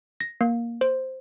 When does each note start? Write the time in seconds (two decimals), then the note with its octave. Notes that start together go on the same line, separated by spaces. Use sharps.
0.20 A#6
0.41 A#3
0.81 C5